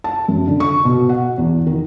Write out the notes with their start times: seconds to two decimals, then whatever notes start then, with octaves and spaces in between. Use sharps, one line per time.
0.04 A5
0.28 F#2
0.47 D3
0.60 C#6
0.85 B2
1.09 F#5
1.38 E2
1.67 D#3